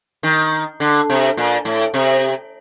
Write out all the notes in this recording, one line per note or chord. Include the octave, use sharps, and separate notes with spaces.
D#3
D3
C3
A#2
A2
C3